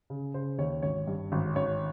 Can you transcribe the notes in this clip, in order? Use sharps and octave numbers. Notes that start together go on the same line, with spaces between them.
C#3
C#3 C5
D#2 C#5
G#1 C#5
G2
G#1
G#1 C#5